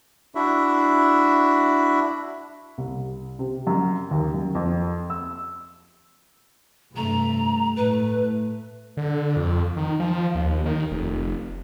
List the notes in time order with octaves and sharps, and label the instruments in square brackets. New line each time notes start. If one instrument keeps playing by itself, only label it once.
[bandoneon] D4 E4 F#4 E5
[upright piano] C2
C3
F#2
D#2
F#2
F2
E6
[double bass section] G2 C3 A3 [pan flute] A#5
[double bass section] A2 A3 [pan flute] B4
[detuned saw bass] D3
F2
D#3
F3
D#2
D#3
F1